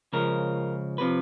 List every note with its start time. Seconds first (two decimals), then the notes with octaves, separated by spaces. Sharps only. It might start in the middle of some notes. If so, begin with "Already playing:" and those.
0.13 C#2 C#3 F3 A#4
0.98 C3 F3 B4